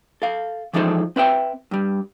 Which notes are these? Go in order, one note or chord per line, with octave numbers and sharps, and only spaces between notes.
A4 F5
E3 F3 G#3 D#4 A4 C5
C4 B4 E5 G5
G2 G3